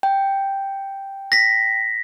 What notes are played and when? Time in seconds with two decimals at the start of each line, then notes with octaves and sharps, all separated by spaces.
0.03 G5
1.32 A#6 B6